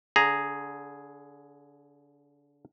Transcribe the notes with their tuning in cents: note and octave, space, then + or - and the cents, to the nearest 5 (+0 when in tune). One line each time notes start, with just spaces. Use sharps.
D3 -30 G#4 +0 A#5 +0